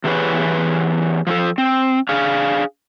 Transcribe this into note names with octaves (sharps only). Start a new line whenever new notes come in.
E2 E3 G4 G#4 B4 C#5
F3 F#3 A4
C4
D4 G#4 F5